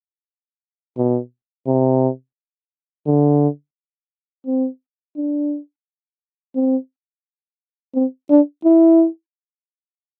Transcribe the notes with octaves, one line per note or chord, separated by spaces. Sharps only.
B2
C3
D3
C4
D4
C4
C4
D4
E4